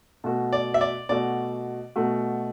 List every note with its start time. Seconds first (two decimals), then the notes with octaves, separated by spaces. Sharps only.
0.24 B2 A3 F#4
0.53 D5
0.74 E5
0.81 D5
1.09 B2 A3 F#4 D5
1.96 B2 A3 F#4